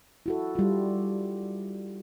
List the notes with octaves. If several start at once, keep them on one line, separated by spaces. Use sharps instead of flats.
E4 F#4 A4
G3 F4